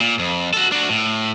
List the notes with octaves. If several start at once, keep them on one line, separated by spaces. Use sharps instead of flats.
A#2
F2
F#4 A4
D4 F#4
A2